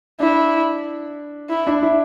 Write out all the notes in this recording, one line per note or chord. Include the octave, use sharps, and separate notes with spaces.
D4 E4
E4
D4
E4